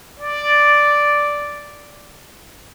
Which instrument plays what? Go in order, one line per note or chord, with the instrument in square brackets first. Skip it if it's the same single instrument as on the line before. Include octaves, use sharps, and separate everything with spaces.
[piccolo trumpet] D5